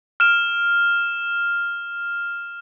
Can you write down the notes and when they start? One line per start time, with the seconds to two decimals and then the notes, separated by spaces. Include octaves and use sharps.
0.20 F6 E7